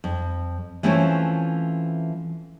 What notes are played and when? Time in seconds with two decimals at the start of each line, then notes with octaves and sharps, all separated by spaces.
0.04 F2
0.83 E3 F3 A3 C4 C#4 E4